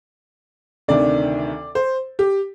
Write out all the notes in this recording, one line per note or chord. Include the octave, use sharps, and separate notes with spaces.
D2 C3 D#3 D5
C5
G4